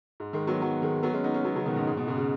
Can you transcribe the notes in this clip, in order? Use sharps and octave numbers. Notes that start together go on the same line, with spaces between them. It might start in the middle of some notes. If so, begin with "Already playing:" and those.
G#2
D#3 G#3
F#3 B3
F#3 B3
D#3 G#3
F#3 B3
G#3 C#4
B3 D#4
G#3 C#4
F#3 B3
C#3 F#3
B2 D#3
G#2 C#3
G#2
B2
G#2 C#3
C#3